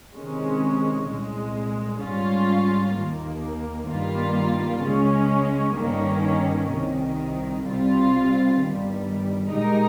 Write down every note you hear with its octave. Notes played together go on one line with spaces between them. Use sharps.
C3 D#3 G#3 C#4
C2 A#2 G#3
G#2 G3 C#4 F4
D#2 D#3 A#3
G2 D#3 G3 A#3 F4
C#2 C#3 G#3 C#4
G1 G2 D#3 A#3 C#4
C2 C3 D#3
C2 C3 G3 C4 F4
G1 G2 D#3 G3
A#2 G#3 D#4 G4 A#4